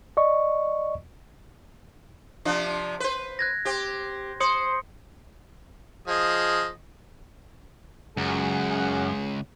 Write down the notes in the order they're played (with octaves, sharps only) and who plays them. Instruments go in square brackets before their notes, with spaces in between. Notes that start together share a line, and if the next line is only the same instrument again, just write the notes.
[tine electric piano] D5 D#5 C#6
[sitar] C3 F3 D4
B4 C5
[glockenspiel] F#6 G#6 A#6
[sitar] C4 G4
[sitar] C5 [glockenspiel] C6 D#6 C#7
[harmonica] F3 G#4 D#5
[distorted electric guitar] C#2 [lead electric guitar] F#2 [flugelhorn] G#4